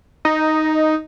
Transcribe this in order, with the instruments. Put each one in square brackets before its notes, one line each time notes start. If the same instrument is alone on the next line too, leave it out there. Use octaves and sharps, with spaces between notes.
[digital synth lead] D#4